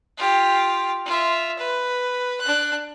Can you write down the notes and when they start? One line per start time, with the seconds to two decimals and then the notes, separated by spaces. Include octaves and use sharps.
0.17 F4 G4
1.06 F4 E5
1.58 B4
2.41 D4 F#6